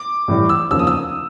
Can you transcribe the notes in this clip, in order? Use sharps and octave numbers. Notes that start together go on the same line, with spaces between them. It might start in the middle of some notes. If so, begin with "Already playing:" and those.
Already playing: D6
A2 E3 G3
E6
F1 D#2 C#3 F3 A#3 E6
D#6
E6